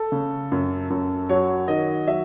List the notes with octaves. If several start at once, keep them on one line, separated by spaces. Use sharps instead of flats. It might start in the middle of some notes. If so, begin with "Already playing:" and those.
Already playing: A4
C#3
F#2
F#2
F#3 C#5
D#3 D#5
F#3 E5